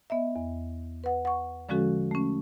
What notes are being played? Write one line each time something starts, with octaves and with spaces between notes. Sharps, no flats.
B3 D#5 E5
E2
B4 F#5
F#5 C#6
D3 F3 G#3 C#4 F#4 A4
A3 C#4